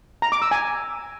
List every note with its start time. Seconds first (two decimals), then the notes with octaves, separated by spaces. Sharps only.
0.22 A#5
0.32 D6
0.42 E6
0.51 G#5